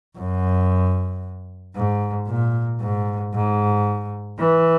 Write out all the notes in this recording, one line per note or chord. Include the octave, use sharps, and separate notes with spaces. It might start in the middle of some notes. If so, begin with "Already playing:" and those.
F#2
G#2
A#2
G#2
G#2
E3